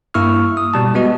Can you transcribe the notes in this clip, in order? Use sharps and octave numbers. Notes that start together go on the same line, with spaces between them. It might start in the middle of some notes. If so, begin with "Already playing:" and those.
G2 A#3 E4 C#6 E6 F6
D#6
B2 G3 A5
G#3 B3 F#4 D#5